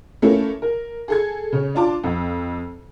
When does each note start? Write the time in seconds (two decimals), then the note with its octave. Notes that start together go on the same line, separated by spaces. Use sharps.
0.22 A3 A#3 C#4 E4 A4
0.62 A#4
1.08 G#4 A4 G#6
1.52 C#3 C#4
1.75 D4 F4 A5 D6
2.04 F2